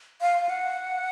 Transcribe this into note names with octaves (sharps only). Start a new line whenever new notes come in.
F5
F#5